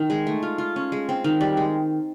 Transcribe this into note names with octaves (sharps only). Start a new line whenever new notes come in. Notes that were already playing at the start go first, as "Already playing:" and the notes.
Already playing: D#3
G#3
A3
F4
F4
C#4
G#3
C4
D#3
G3
G#3